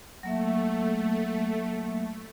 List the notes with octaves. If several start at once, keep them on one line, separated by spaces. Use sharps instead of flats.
F#3 A3 A#3 E5